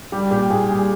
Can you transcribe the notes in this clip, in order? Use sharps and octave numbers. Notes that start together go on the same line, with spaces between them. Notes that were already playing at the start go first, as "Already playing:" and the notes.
G3 G4
A#2 G4
A#2 G#4
G3 G#4